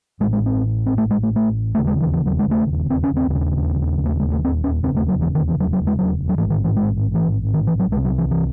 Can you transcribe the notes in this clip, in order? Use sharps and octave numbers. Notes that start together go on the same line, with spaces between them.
A1 A2 G#3
G#3
C4
C4
A3
G#3
A3
A3
E1 D#2 C#3 A3
G#3
E3
E3
F#3
G#3
A3
C4
C#4
C4
E1 D#2 C#3
A3
G#3
A3
C4
C#4
E1 D#2 C#3 C4
A3
F#3
E3
D#3
E3
F#3
F#3
G#3
F#3
F#3
A1 G#2 E3
D#3
E3
G#3
E3
D#3
E3
F#3
C2 C3 G#3
F#3
E3
E3